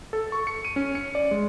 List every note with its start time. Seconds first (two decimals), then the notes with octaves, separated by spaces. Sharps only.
0.13 A4
0.32 C#6
0.47 C#7
0.65 D#7
0.76 C#4
0.95 C#7
1.15 D5
1.31 G#3